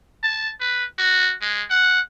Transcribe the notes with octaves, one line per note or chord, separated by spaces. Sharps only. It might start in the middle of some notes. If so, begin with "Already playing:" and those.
A5
B4
F#4
G#3
F#5